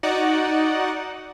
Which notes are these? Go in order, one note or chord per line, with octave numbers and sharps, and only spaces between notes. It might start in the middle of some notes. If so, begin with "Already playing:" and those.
D#4 F#4 D5 F#5